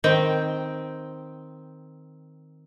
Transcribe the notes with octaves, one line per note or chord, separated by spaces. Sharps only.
D#3 C4 G5